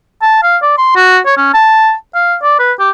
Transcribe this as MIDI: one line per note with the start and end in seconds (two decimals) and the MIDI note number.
0.22 0.40 81
0.43 0.57 77
0.62 0.77 74
0.78 0.95 84
0.96 1.18 66
1.26 1.34 73
1.37 1.49 61
1.54 1.93 81
2.15 2.36 77
2.43 2.56 74
2.59 2.72 71
2.80 2.90 67